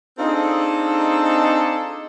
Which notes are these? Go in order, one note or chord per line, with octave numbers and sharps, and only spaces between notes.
C4 D4 D#4 F4 G#4 A4